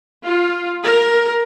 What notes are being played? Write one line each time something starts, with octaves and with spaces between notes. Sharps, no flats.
F4
A#4